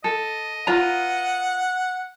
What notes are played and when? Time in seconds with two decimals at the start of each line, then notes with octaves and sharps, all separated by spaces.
0.04 A4 D#5
0.67 F4 B4 F#5 A#5